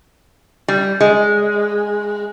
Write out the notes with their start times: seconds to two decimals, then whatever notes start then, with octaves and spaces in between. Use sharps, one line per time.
0.68 G3
1.01 G#3